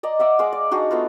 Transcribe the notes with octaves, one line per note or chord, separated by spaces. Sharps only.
D5 D#5 A#5
D5 E5 F#5
G#3 F5 D6
D5
D4 D#4 F#4 G#4
A3 B3 F4